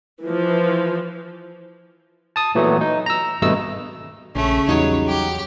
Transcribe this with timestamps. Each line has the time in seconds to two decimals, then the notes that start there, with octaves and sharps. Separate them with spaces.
0.21 E3 F3
2.36 A5 D#6
2.55 A#2 E3 F#3 A3 B3
2.81 D#4
3.06 A#5 E6
3.42 G#1 G2 B2 A3 D#5 E6
4.36 A#1 C#3 A3 C#4
4.69 E2 F#3 G3 D#4 C#5
5.08 G4 G5